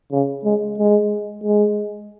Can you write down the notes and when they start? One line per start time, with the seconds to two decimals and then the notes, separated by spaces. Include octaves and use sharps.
0.11 C#3
0.44 G#3
0.78 G#3
1.44 G#3